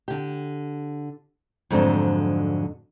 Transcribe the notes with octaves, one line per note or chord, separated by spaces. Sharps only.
D3 G4
F2 G#2 D3 F#3 D4